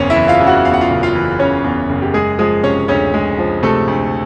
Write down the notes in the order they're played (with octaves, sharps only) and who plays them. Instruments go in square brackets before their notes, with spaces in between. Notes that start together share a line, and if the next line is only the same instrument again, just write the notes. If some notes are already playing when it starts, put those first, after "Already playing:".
Already playing: [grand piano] F#1 E2 C#3 C4 C#4 C#5
E4 E5
E3
F4 F5
C#3
F#4 F#5
E2 F5
F#5
F4 F5
F#1
F4 F5
E3
C#3 C#4 C#5
E2
F#1
G4
G#3 G#4
F3 G#3 G#4
C3 C#4 C#5
D2 C#4 C#5
G#3
F3
C3 A3 A4
D2